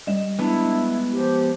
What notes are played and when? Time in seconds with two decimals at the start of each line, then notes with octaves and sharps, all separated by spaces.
0.07 G3 D#5 E7
0.39 G#3 B3 D4 E4
1.12 F3 G4